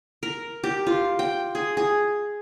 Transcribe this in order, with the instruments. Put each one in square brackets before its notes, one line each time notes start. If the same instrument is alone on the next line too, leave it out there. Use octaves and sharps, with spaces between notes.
[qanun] A#4
G4
F4
G5
G#4
G#4